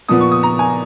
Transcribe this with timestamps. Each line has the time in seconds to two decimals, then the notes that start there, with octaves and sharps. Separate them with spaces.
0.08 A#2 F3 B3 D#6
0.21 C#6
0.32 D#6
0.43 A#5
0.59 G#5